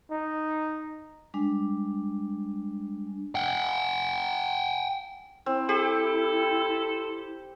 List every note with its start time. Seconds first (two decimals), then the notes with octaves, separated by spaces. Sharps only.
0.11 D#4
1.34 G3 G#3 D4
3.35 F#5 G5
5.46 C4 E4
5.69 G4 A4